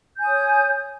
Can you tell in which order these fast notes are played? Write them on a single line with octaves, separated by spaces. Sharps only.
G6 G#5 D#6 C#5